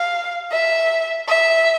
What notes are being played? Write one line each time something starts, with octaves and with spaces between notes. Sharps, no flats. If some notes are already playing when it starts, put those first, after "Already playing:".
Already playing: F5
E5
E5